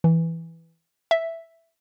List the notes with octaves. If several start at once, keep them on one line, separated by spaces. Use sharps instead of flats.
E3
E5